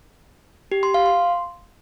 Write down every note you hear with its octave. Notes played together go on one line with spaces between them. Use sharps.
G4
C6
F5
C6